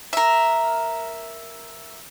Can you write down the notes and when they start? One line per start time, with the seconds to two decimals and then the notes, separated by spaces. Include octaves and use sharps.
0.13 A#4 E5